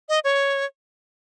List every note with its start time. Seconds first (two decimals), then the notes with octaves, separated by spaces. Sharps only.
0.09 D#5
0.24 C#5